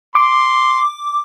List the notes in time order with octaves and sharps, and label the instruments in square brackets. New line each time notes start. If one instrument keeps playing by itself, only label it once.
[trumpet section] C6 [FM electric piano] D6